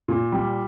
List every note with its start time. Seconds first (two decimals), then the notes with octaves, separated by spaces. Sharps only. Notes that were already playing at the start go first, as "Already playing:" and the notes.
0.08 A#2
0.32 G3